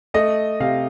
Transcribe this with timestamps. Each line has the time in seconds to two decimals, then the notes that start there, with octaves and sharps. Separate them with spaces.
0.14 A3 D#5
0.60 C3 F5